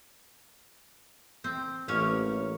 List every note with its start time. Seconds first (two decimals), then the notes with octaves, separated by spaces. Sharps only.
1.44 C4
1.88 A1 A#3 C#4 C#5